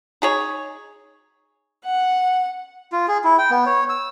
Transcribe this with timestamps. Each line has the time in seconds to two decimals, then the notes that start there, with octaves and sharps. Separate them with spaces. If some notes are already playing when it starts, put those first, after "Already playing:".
0.22 D#4 G#4 C#5
1.85 F#5
2.92 F4
3.08 G#4
3.24 E4
3.38 G5
3.51 B3
3.66 C#5
3.89 E6